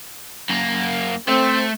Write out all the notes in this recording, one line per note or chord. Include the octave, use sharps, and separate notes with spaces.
F#2 A#3
A3 C4